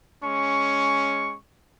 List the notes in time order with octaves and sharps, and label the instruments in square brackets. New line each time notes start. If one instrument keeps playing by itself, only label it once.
[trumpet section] G#3 C#4 C#6